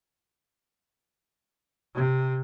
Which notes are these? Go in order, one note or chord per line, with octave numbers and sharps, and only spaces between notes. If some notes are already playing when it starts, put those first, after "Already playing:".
C3